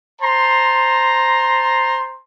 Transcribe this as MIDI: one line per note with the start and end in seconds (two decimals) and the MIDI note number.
0.21 2.17 72
0.21 2.17 81
0.21 2.17 82
0.21 2.17 84